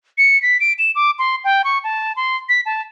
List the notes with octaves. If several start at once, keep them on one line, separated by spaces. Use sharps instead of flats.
C#7
B6
D7
E7
D6
C6
G5
C#6
A5
C6
B6
A5